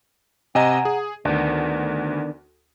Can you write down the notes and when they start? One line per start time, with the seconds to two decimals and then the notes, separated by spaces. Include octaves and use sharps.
0.55 C3 D#5 F#5 G#5 A#5
0.85 G#4
1.25 D2 D#3 B3 D4